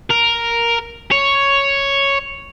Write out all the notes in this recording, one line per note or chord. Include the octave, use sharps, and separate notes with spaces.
A#4
C#5